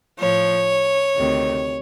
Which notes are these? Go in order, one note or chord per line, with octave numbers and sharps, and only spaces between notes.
A2 F3 C#5
D2 C3 D#3